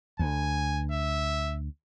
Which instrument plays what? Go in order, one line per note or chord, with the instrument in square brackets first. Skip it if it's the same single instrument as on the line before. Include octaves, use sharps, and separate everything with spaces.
[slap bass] D2 [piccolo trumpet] G#5
[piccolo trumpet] E5